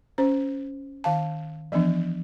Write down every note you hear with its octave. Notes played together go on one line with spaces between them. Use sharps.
C#4 C5
D#3 F5 A5
E3 F3 B3 D4